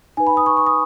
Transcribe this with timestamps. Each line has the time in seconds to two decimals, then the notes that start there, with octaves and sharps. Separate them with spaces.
0.17 D#4 B4 G#5
0.27 B5
0.37 D#6
0.46 C#6
0.57 C#6
0.66 D#6